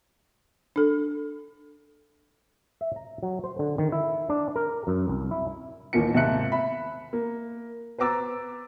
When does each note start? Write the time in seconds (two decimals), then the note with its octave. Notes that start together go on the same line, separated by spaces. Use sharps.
0.76 D4 A4
2.81 E5
2.96 A#5
3.23 F#3
3.44 C5
3.59 D3
3.78 D#3
3.92 E4
4.30 D4
4.56 A#4
4.87 F#2
5.08 C2
5.31 E4
5.93 A1 D#2 A#2 A#3 D#4 C#7
6.14 D#2 G#2 C3 E5 F#6 C#7
6.52 E5 B5
7.13 A#3
7.98 B4 C5 A#5 D6 E6 A6